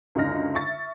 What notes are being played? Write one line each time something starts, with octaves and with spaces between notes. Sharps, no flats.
C#2 F#2 D3 D#4 F6 A#6
E5 C#6 A6